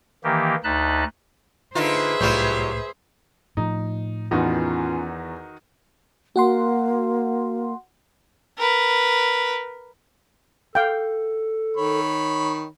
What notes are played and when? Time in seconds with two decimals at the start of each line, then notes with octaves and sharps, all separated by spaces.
0.24 D#3 E3 A#3 G4
0.64 D2 D#4 D#5 A5 B5 F#6
1.75 D3 D#4 F4 G#4 B4 C5 E5
2.20 C2 A2 F#3 G3 F4 G6
3.57 A2 F3 D#4
4.31 E2 D#3 B3 C#4 D#4 F4 F#4
6.36 A#3 F#4 F#5 C6
8.58 A#4 B4
10.75 A4 F5 G5
11.77 D#3 C#5 B5